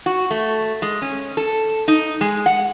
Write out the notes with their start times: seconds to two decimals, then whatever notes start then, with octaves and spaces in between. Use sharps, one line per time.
0.06 F#4
0.31 A3
0.82 G#3
1.02 C#4
1.37 A4
1.88 D#4
2.21 G#3
2.46 F#5